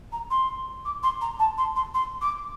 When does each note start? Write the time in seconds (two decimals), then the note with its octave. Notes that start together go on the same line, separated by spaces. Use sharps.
0.12 A#5
0.30 C6
0.85 D6
1.03 C6
1.21 A#5
1.39 A5
1.58 C6
1.76 C6
1.94 C6
2.21 D6